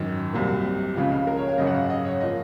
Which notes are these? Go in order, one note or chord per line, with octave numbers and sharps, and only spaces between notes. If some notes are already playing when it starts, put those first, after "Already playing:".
Already playing: G#1 F#2 D#3
C2 C3 F#3 A#3
C#2 C#3 F3 F5
F5
A#4
C#5
F5
G#1 F#2 C#3 D#5
F#5
F5
D#5
C#5
F3 A#3 D#5